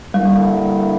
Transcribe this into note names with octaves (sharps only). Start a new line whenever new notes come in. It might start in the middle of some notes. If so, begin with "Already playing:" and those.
G2 D3 G3 A#3 E4